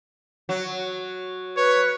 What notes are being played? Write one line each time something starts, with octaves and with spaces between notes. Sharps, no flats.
F#3
B4 C#5